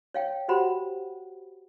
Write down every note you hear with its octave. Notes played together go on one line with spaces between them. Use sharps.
C#5 F5 G5
F#4 G4 C5 F#5 B5